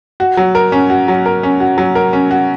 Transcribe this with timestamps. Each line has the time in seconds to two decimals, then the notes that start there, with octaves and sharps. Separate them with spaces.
0.20 F#4
0.37 F#3
0.55 A#4
0.72 C#4
0.90 F#4
1.08 F#3
1.26 A#4
1.43 C#4
1.60 F#4
1.78 F#3
1.95 A#4
2.13 C#4
2.31 F#4